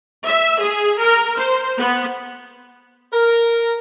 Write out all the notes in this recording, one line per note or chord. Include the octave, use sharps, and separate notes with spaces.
E5
G#4
A#4
C5
B3
A#4